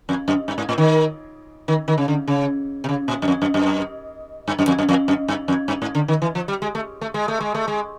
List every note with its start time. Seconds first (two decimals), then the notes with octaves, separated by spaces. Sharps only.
0.09 F2
0.28 F#2
0.48 G2
0.58 G#2
0.69 A2
0.78 D#3
1.68 D#3
1.88 D#3
1.98 C#3
2.08 D3
2.28 C#3
2.84 C3
2.89 C#3
3.08 A#2
3.22 F#2
3.28 F2
3.42 F#2
3.54 F#2
4.48 G2
4.59 F#2
4.68 F2
4.79 F#2
4.89 F2
5.08 F#2
5.28 G2
5.48 F2
5.68 G2
5.82 G#2
5.95 D3
6.08 D#3
6.22 E3
6.35 F3
6.48 G3
6.62 G#3
6.75 A3
7.01 A3
7.14 G#3
7.28 A3
7.40 G#3
7.55 A3
7.68 G#3